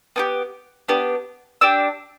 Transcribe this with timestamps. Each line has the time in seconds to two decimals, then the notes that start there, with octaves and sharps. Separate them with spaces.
0.16 B3 D4 G4
0.88 B3 D4 G4
1.61 D4 G4 E6